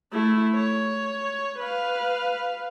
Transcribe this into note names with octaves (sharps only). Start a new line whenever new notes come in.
A3 E4
C#5
B4 F5